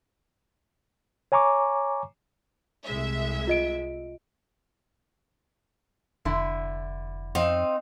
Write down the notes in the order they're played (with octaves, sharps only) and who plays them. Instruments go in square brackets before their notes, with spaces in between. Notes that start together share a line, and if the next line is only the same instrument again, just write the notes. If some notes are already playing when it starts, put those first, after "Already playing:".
[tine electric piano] C#5 G#5 A#5 C#6 D6
[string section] C2 G#3 E5
[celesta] F4 D#5 D7
[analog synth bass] F1 [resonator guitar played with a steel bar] D3 E4
[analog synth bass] F2 [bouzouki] C4 D#4 F5